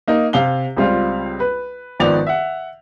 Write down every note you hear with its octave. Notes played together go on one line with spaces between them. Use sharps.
A#3 D#4
C3 F5 G7
C#2 G3 C4 F4 F5
B4
G#1 D#3 F3 B3 D5 F7
E5 F#5